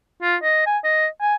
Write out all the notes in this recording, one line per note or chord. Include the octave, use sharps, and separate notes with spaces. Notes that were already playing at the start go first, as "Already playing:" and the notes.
F4
D#5
G#5
D#5
G#5